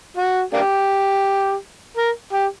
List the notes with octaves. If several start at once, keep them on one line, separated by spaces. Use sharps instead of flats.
F#4
A#3 D4 G4
A#4
G4